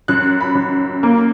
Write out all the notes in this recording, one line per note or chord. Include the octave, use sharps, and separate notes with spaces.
F#2 F#6
B5
F#2
A#3